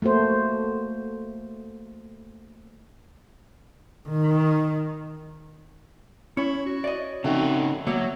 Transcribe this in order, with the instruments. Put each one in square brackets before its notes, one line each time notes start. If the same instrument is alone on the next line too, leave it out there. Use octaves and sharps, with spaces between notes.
[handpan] A3 A#3 F#4 C5
[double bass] D#3
[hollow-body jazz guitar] C#4 [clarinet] E4 [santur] C#5
[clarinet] F#4
[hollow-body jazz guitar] D5 D#5
[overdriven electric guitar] C#3 D#4 [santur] A3 F#4 [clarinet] C4
[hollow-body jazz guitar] D2 A#3 C#5 [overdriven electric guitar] F#3 [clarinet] B3 [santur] E5